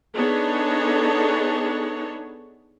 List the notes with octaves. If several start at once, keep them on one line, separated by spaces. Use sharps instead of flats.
B3 D4 D#4 G#4 A4 C#5